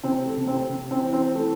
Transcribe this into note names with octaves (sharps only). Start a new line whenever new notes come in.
C3 C4
A3
C3
C4
C3
C4
E3
C4
E3 A3